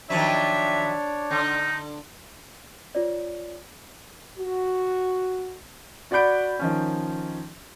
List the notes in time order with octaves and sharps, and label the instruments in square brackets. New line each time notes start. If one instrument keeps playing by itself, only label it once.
[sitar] D#3 F3 F#3 [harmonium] D4 C#5 D5 [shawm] E5
[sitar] D3 [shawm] D#4
[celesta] F4 C#5 D5
[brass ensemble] F#4
[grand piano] F#4 D5 F#5 B5 G6 D7
D#3 F3 C#4